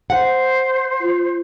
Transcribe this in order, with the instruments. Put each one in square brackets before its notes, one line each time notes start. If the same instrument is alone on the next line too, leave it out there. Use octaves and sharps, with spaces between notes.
[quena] C5 [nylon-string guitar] F#5
[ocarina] F4